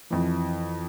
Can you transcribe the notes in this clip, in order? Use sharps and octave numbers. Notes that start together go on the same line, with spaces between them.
F2 E3